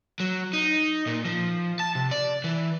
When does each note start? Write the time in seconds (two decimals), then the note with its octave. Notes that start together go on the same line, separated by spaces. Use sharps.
0.20 F#3
0.53 D#4
1.07 A#2
1.25 F3
1.79 A5
1.95 C3
2.11 D5
2.44 E3